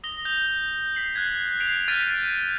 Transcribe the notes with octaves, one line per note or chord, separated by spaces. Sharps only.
D#6 A#6 G7
G6 F7
B6 C7 F#7
F#6 G#6 B6
G6 C7 D7 F7
F6 G6 A6 B6 D7 D#7